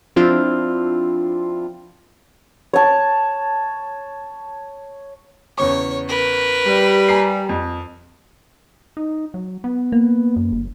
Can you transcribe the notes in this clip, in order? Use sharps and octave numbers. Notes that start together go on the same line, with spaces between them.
F3 C4 D4 E4 F4
C#5 A5
E2 C#3 C#5 C#6
A#4 B4
G3
G#5 A#5 C7
F2
D#4
F#3
B3
A#3
F#2
G1